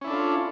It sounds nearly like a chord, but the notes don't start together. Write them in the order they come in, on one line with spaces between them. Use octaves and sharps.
C#4 E4 D4 A4 F4